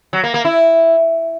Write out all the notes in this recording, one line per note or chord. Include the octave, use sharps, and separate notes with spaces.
F#3
A#3
A#3
E4